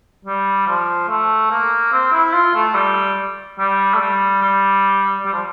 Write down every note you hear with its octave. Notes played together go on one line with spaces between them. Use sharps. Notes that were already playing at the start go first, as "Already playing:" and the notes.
G3
F3
A3
A#3
C4
E4
F4
A3
G3
G3
A3
G3
G3
G3
F3